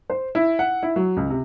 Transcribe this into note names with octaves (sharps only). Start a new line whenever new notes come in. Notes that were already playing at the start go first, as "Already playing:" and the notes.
C5
E4
F#5
E4
F#3
C#2
C3